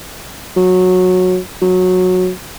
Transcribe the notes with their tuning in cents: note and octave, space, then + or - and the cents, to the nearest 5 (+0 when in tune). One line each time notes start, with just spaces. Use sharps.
F#3 -15
F#3 -15